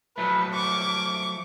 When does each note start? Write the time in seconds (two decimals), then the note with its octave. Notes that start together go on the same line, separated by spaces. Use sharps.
0.18 F3 F#3 A3 B4
0.56 C#6 D6